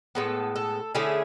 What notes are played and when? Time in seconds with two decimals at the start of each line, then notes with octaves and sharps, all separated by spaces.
0.15 A2 G#3 B3 A4
0.56 A4
0.95 D3 A3 C#4 E4 G#4